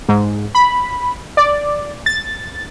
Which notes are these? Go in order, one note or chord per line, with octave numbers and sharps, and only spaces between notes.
G#2
B5
D5
A6